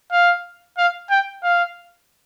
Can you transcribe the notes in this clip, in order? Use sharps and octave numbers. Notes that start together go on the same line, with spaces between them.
F5
F5
G5
F5